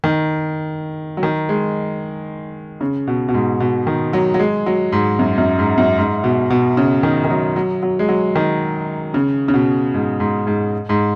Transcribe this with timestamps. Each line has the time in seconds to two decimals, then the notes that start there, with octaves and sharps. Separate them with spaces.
0.04 D#3
1.17 F#3
1.23 D#3
1.49 G#3
2.81 C#3
3.07 B2
3.28 B2
3.34 G#2
3.60 B2
3.87 D#3
4.13 F#3
4.34 F#3
4.39 G#3
4.66 F#3
4.92 G#2
5.19 F#2
5.38 F#2
5.59 G#2
5.78 F#2
5.98 G#2
6.24 B2
6.50 B2
6.77 C#3
7.03 D#3
7.24 D#3
7.30 F#3
7.56 F#3
7.83 F#3
7.99 G#3
8.09 F#3
8.36 D#3
9.14 C#3
9.48 C#3
9.54 B2
9.94 G#2
10.20 G#2
10.47 G#2
10.89 G#2